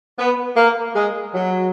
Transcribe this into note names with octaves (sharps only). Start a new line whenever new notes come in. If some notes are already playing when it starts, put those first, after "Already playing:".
B3
A#3
G#3
F#3